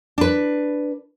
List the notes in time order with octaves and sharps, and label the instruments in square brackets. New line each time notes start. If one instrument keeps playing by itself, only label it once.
[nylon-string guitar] D4 B4